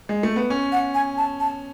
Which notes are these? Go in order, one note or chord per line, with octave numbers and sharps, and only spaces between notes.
G#3
A3
B3
C#4
F#5
G#5
A5
A5